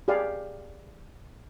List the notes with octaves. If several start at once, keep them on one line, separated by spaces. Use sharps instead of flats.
G4 G#4 D5 F5